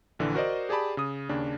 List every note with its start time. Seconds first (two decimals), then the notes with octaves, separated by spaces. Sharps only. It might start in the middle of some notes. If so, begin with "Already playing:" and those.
0.19 A#1 D3 E3
0.34 F#4 A#4 C5 D5 D#5
0.69 G4 G#4 D5 A5 B5
0.97 C#3 D#6
1.29 D#2 C#3 D4